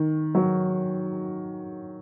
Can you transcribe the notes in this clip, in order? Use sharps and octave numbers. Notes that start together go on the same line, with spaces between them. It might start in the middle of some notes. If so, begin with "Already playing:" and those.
Already playing: D#3
F#3